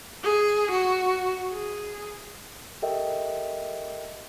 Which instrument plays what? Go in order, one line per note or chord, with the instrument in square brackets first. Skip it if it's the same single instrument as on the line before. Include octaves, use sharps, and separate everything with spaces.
[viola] G#4
F#4
G#4
[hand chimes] G4 A4 A#4 D#5 E5 G5